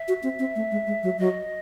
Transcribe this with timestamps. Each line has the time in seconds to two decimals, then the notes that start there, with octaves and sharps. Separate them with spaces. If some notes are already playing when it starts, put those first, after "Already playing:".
Already playing: E5
0.08 F#4
0.23 C4
0.39 C4
0.56 A3
0.71 G#3
0.87 G#3
1.03 F#3
1.19 F#3 D#5